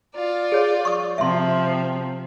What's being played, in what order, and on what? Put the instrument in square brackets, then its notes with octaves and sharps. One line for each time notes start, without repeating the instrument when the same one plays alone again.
[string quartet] F4 D5
[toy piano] G#4 C#5
C#6 D#6
[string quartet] C3 F3 C4 [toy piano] E5 C6